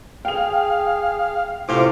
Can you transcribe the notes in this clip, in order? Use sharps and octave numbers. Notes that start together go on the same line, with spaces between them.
G#4 F5 G5 F7
A2 C3 C#4 F4 C5 D6